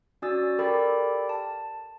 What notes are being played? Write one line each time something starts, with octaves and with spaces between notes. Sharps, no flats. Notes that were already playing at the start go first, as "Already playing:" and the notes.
C#4 F#4 D5 D#6 E6 A6
G4 A4 A#4 D5 G5 B5
A5